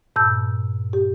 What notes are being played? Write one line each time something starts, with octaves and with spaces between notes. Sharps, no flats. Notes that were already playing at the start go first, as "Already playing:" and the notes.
G2 A#2 A5 E6 G6
G4